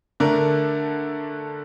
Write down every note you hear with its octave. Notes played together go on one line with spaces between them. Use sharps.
D3 A3 D4 A#4